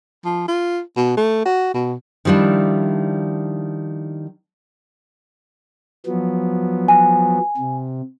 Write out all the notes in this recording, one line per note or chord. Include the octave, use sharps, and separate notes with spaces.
F3
F4
B2
A3
F#4
B2
D#3 F3 G3 D4 E4
F3 F#3 B3
G#5
C3